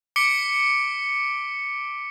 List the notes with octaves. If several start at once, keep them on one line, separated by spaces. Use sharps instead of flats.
D6 B6 C#7 D7 G7